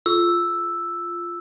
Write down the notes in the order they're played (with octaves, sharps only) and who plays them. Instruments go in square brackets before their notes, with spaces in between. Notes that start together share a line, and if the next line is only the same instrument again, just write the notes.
[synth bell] F4 [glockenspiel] E6